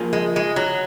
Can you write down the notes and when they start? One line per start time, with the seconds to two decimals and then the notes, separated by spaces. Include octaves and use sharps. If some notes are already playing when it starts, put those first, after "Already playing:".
Already playing: F3 A#3 F4 G#4
0.13 G#3
0.36 G#3
0.56 F#3